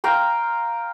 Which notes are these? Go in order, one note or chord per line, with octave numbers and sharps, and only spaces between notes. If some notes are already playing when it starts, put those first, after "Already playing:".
F5 G5 A#5 C6